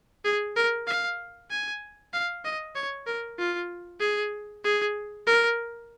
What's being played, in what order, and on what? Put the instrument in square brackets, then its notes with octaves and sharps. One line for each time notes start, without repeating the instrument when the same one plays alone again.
[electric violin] G#4
A#4
F5
G#5
F5
D#5
C#5
A#4
F4
G#4
G#4
A#4